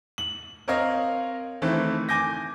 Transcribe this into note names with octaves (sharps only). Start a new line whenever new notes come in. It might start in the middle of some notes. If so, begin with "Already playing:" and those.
F#7
C4 A#4 C#5 D#5 F5
D#3 E3 A3 C4
G#5 D6 G6 A#6